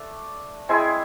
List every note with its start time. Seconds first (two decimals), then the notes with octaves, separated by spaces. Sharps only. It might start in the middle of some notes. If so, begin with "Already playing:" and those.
Already playing: A3 D4
0.69 G#3 C4 E4 G#4